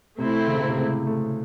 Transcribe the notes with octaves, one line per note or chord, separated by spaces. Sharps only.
C3 A3 C4 E4
C#3
C3
A2
C3
G#3
A3